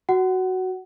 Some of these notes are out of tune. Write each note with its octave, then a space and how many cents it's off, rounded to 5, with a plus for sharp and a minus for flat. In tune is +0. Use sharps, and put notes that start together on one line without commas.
F#4 +5 F#5 +20